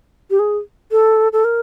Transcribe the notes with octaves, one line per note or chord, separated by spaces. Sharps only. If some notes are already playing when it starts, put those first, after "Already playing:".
G4
G#4
A4
A4
A#4